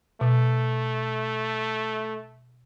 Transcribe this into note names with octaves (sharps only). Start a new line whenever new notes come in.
B2 A3